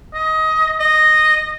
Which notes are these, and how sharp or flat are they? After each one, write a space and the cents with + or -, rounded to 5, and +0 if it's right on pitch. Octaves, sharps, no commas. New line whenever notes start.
D#5 +20
D#5 -10